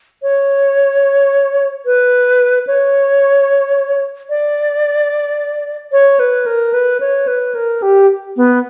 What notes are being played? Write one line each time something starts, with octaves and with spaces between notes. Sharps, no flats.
C#5
B4
C#5
D5
C#5
B4
A#4
B4
C#5
B4
A#4
G4
B3